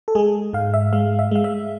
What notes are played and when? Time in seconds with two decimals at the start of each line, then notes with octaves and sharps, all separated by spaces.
0.08 A4
0.15 G#3 G#4
0.53 G#2 F5
0.74 E5
0.93 G#3 F5
1.19 E5
1.31 G#3 F5
1.44 E5